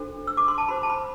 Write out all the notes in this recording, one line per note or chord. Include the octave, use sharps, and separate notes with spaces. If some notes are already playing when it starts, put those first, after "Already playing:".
Already playing: D4 F#4 A4 C5
E6
D6
C6
A5
F#4 C5 B5
A5
B5